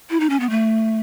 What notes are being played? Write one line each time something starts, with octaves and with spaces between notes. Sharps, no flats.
E4
D#4
C#4
B3
A3